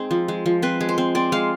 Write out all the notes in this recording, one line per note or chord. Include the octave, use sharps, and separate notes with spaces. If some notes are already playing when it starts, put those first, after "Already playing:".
Already playing: G#3 C4 D#4 G#4
F3
G#3
F3
C4 B4
G#3
C5
C4
C4 D5
G#3 F5